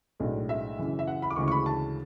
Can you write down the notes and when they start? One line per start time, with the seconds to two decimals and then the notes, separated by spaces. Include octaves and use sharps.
0.20 B1 A2 G#3 D4
0.49 E5
0.79 F#2 C#3 E3
0.99 E5
1.07 F#5
1.22 B5
1.30 D6
1.36 D2 C#3 E3 G#3 C#6
1.48 C#6
1.51 B5
1.66 A5